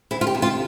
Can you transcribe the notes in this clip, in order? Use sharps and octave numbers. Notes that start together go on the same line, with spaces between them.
D2 E4
F4
G4
C3
F4